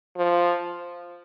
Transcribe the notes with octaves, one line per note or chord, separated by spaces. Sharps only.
F3